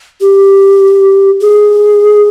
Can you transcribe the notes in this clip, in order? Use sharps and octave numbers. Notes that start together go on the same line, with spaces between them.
G4
G#4